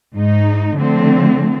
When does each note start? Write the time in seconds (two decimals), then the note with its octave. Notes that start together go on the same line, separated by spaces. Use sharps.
0.13 G#2 D#4
0.75 D3 F3 A3 C4